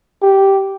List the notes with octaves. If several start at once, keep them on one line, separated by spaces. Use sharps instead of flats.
G4